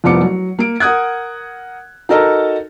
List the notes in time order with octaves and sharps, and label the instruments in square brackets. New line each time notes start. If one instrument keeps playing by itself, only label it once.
[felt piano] F1 C2 F3 B3 D6 C#7
F#3
A#3 D7
A#4 F#5 D#6 F#6 G#6
D#4 F#4 A4 A#4 D#5 A5